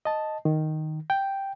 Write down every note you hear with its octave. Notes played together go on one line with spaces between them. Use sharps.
D#5 A5
D#3
G5